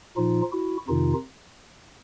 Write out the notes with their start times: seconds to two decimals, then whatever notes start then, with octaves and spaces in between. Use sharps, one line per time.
0.17 A#2 F3 D#4 F4
0.52 E4 F#4
0.88 F2 C3 D#3 D#4 F4